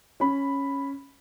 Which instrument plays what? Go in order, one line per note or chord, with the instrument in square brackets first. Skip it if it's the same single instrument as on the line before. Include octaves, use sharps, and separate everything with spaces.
[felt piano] C#4 B5